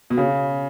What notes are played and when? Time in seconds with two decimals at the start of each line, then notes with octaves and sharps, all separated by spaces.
0.10 B2
0.18 C#3